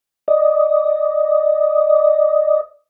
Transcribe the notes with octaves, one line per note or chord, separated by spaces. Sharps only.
D5 D#5